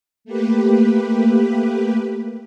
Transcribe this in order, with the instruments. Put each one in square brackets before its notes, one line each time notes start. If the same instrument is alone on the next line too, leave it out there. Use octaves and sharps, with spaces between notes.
[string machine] A3 A#3 G4 B4